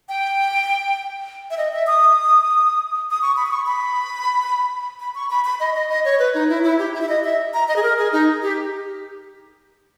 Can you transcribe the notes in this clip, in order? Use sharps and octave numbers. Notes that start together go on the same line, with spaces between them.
G5
E5
D#5
E5
D#6
D#6
C#6
B5
D#6
C#6
B5
B5
C#6
B5
B5
D#5
D#5
D#5
C#5
B4
D#4
E4
E4
G4
E4
E5
D#5
E5
A#5
D#5
G#4
A#4
G#4
D#4
G4